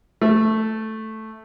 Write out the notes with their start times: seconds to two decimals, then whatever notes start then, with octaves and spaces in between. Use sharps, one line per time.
0.21 A3